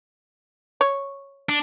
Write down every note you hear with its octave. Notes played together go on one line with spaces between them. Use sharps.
C#5
D4